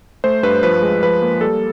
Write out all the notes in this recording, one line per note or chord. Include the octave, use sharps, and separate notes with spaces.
A3 C5
G2 B4
F3 B4
G#3
F3 B4
A#3
G3 A4